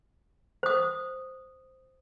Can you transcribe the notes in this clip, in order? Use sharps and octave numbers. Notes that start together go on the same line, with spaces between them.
C5 D#6